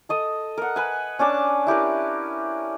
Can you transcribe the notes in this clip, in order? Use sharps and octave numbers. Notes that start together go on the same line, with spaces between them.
A4 D#5 D#6
A#4 F#5
B4 G#5
C#4 D4 A5 D6
E4 G4 A#4 B4